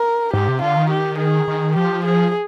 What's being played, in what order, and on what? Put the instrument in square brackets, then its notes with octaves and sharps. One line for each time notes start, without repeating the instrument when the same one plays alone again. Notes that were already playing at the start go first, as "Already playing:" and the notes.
Already playing: [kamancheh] A#4
[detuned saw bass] G#2 [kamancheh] G4
[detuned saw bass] C3
[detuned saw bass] D3 [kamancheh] F4
[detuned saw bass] D#3
[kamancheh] G4
G#4
[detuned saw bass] D#3
[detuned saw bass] F3 [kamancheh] G4
[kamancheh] G#4